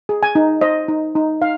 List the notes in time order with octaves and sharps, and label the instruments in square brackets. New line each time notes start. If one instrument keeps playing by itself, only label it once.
[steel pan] G#4
G#5
D#4
C5 D#5
D#4
D#4
D#4 F5